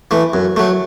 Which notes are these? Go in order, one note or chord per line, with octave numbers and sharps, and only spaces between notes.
E3 A3
F#2
F#3 A3